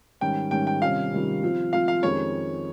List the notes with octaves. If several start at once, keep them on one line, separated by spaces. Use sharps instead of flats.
G#2 D#3 G3 C#4 G5
G#2 D#3 G3 C#4 G5
G5
C3 D#3 G3 C#4 F4 F5
C3 D#3 G3 C#4 F4
F3 C4 F4
F3 C4 F4 F5
F5
F2 D#3 G#3 C#4 G4 C#5